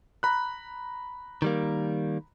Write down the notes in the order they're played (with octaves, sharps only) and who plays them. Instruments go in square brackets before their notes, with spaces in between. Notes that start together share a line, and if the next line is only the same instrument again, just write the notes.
[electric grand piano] A#5 B5 F#6
[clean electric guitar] D#3 G3 A#3